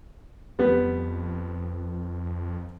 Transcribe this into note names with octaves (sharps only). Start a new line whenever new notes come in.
F2 G3 B3